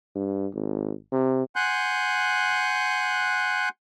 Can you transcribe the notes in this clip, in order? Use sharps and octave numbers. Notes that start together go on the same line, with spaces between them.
G2
G#1
C3
F#5 G#5 C6 F#6 G6